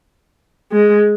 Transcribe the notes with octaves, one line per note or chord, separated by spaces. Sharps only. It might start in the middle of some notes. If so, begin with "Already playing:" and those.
G#3